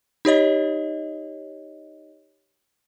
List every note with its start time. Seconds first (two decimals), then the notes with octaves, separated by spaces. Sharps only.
0.25 D#4 G4 C#5 D#5